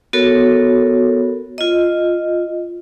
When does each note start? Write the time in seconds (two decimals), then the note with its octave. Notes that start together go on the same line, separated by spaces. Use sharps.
0.13 B3 F#4 A4 A#4 C#5
1.58 F4 D#5